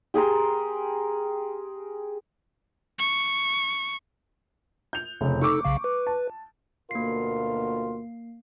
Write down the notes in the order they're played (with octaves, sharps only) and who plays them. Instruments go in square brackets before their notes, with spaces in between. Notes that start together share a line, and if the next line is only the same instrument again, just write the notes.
[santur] G4 G#4 A#4 C6
[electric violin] C#6
[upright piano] G6 F7
F1 C#3
[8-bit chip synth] D#4 A4 E6 [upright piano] C#6 D6
[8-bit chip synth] B1 C#3 F5
B4
[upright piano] A5
[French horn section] D2 B2 A#4 [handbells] A#3 C7 [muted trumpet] F4